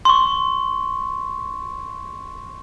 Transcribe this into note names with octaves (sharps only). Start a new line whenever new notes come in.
C6 C#6